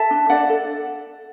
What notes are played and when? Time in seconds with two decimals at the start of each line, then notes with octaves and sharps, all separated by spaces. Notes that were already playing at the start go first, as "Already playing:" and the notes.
Already playing: A4 E5 A5
0.11 D4
0.30 D4 D5 F#5
0.49 A4